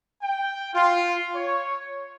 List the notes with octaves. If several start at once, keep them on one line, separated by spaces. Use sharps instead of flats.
G5
F4
C#5